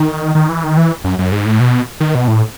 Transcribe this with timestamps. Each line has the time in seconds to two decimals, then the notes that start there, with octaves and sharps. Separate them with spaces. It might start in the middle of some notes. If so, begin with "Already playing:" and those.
Already playing: D#3
0.35 D#3
0.49 E3
0.64 D#3
0.77 E3
1.04 F#2
1.19 F#2
1.32 G#2
1.45 A2
1.60 B2
2.01 D#3
2.15 B2
2.28 A2